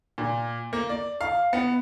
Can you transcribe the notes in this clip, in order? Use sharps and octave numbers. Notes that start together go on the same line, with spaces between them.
A#2
A#3
D5
F5
B3